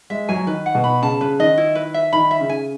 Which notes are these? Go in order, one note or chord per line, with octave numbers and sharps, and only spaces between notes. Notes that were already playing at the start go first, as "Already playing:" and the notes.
G#3 E5
F#3 G#5
D#3 B4
F#5
B2
B5
C#3 A5
C#3 B4
D#3 D#5
E4
B4
E5
D#3 B5
E5
C#3
G#5